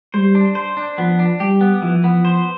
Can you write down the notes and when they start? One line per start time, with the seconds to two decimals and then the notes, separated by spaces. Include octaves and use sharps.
0.14 G3 C5
0.35 D4
0.55 C5
0.77 D4
0.98 F3 B3
1.19 D4
1.40 G3 G4
1.61 B3
1.82 E3 F3
2.04 B3
2.25 C5